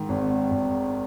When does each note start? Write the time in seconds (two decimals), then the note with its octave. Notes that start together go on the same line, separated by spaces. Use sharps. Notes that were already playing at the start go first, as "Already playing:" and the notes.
Already playing: G#2 D#3
0.09 G#1
0.51 G#1